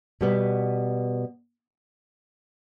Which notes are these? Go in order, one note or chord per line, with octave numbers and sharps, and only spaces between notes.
B2 G3 B3